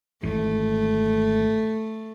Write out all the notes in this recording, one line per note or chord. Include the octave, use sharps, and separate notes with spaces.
G#1 E3 A3